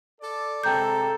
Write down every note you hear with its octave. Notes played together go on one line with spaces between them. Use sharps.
A4 D5
C3 G#3 A4 G5 A#5 G6